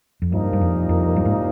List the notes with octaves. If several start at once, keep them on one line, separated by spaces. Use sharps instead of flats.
F2
C2 G2 A#2 F3 A#3 D#4
G2
F2
F2
G2
G#2